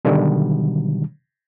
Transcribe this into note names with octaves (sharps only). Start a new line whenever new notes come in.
B2 D3 D#3 F#3 G3